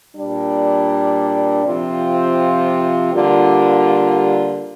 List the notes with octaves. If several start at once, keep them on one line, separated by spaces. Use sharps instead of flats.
A#2 G3 D4
C3 F3 C4 F4
D3 G3 A#3 F4